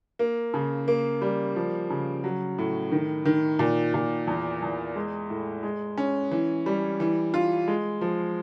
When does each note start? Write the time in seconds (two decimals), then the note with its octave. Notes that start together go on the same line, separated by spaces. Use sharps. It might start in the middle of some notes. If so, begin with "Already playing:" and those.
0.19 A#3
0.54 C#3
0.88 A#3
1.22 G3
1.56 F3
1.90 C#3
2.24 F#3
2.58 A2
2.92 D#3
3.25 D#3
3.59 A#2
3.94 A#2
4.27 E2
4.62 E2
4.96 G#3
5.30 A2
5.63 G#3
5.98 C#4
6.31 E3
6.66 G3
7.00 E3
7.34 F4
7.68 G#3
8.01 F3